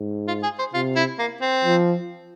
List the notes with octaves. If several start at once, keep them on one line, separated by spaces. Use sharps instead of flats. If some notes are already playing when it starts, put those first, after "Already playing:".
Already playing: G#2
F4
G#4
C5
C3 F4
E4
A#3
C4
F3